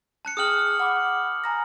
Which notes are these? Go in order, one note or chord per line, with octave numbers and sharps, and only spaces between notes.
A5 F#6 C#7
G#4 G5 D#6 F6 F#6 F#7
F#5 B5 D6
G#5 A#5 A#6